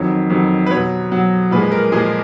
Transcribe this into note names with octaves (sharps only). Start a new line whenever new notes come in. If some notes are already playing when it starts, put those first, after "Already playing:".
Already playing: F2 D#3 F#3 C#5
F2 D#3 F#3
B4
B2 F#3 C#5
B2 F#3
A#2 F3 G#3 B4
A#4
A#2 F3 G#3 G#4